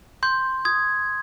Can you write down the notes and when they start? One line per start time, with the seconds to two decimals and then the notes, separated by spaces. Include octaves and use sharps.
0.23 C6 G6
0.65 D#6 G#6